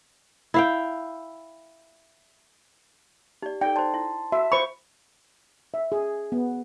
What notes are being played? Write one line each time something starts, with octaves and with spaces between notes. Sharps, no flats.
E4 F5 G5
D#4 G4 D5
D#4 A4 D5 G5
C5 D5 A5 C6
E4
F#4 E5
C5 B5 C#6
E5
G#4
B3